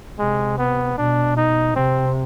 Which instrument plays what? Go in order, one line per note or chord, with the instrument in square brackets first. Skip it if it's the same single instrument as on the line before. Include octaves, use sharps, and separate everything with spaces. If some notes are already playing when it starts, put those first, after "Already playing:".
[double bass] C3 [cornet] G#3
[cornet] B3
[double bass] B2 [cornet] D4
[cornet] D#4
[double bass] C3 [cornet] C4